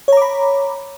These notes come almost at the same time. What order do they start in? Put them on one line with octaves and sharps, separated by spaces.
C#5 A#5 D6 B5